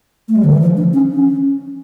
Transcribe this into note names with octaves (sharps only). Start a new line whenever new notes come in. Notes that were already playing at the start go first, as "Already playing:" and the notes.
A3
G3
D3
E3
F3
D4
C#4
C#4